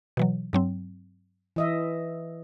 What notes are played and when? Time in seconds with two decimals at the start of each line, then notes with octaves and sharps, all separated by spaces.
0.17 B2 E3 F#3
0.53 G2 F#3 C4
1.56 E3 D#5 E5